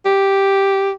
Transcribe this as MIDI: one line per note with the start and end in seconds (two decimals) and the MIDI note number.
0.05 0.91 67